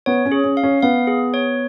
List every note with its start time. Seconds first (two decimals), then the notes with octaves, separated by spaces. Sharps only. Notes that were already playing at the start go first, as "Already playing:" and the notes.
0.06 B3 C#5
0.26 C#4
0.32 G#4
0.44 C#4
0.57 F5
0.63 C#4
0.82 B3 F5
1.07 G#4
1.34 C#5